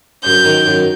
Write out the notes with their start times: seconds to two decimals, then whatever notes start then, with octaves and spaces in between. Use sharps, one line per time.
0.24 F#2 G6
0.44 D#3
0.66 F#2